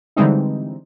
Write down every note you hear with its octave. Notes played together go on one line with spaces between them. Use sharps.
D3 E3 G3 G#3 C4 D#4